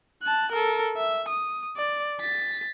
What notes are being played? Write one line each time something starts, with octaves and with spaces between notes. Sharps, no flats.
A5 F#6
A4 A#4
E5
D#6
D5
A6 B6